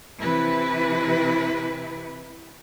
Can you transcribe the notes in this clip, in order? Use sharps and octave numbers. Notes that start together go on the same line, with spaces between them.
C3 E3 E4 B4